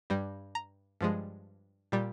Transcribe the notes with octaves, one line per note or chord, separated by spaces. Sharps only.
G2 G3
A#5
G2 F3 G#3
A#2 G3